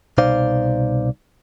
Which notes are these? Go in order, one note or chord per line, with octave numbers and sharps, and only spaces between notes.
C2 B2 D#4 C5 D5 F5